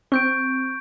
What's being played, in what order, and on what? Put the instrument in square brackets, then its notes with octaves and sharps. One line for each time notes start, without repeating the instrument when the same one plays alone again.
[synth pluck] C4 [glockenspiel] C#6 G6 D7